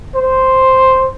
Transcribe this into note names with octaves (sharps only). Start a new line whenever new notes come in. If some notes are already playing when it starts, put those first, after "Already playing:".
C5